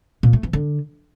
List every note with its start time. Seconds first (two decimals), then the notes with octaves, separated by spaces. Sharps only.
0.23 A#2
0.33 A3
0.43 E3
0.53 D3